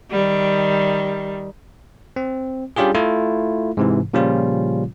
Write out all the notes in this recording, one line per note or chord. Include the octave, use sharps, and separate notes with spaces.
D#3 G3
C4
G3 C#4 D4 F4 G4 G#4
A3 E4 F4
G#2 C3 E3
A#2 C#3 F3 G3 C#4 F4